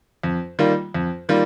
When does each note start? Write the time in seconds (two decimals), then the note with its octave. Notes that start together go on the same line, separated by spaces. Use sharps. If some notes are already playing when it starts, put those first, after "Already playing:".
0.23 F2
0.59 D#3 G3 A#3 F4
0.94 F2
1.29 D#3 G3 A#3 F4